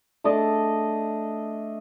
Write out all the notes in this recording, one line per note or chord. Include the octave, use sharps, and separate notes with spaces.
A3 D4 D5 D#5